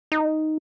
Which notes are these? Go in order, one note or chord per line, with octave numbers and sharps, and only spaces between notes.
D#4